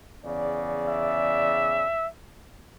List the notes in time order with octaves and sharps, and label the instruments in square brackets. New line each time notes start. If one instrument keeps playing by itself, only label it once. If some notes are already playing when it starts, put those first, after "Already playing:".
[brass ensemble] E2 C#3 D5
[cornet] E5